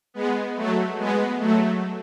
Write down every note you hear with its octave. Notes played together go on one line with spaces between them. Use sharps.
G#3 B3
F#3 A3
G#3 B3
F#3 A3